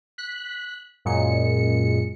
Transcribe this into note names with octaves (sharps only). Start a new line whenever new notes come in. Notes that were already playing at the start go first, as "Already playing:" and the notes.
F#6 B6
F#2 A#2 G#3 C#7